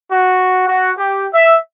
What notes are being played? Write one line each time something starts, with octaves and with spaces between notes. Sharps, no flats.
F#4
F#4
G4
E5